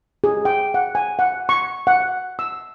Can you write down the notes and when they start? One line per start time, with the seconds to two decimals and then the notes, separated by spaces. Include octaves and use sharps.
0.24 G#4
0.45 G5
0.74 F#5
0.95 G#5
1.19 F#5
1.49 C#6
1.87 F#5
2.39 E6